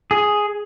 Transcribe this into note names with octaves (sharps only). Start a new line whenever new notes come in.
G#4